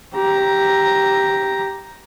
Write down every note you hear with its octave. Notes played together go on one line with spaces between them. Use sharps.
G4 A#5